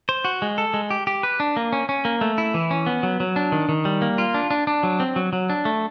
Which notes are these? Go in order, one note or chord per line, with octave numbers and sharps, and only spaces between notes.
C5
F#4
G#3
A4
G#3
G4
G4
B4
D4
A#3
C#4
C#4
A#3
A3
E4
E3
C#4
B3
F#3
F#3
D4
D#3
D#3
G3
A#3
F4
D4
D4
D4
F#3
C4
F#3
F#3
D4
A3